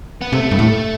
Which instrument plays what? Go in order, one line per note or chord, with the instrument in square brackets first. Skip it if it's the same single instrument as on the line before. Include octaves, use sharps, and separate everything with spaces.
[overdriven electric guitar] B3
[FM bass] C3 [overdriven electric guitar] A3
[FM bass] G2
A2